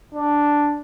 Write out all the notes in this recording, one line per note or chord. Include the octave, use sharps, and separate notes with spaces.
D4